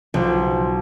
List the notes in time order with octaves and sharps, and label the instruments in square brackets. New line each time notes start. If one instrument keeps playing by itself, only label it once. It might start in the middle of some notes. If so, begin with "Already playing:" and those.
[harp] B1 [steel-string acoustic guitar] F3